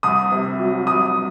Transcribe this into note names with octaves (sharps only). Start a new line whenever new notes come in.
C2 D#6
C3
F#3
C2 D#6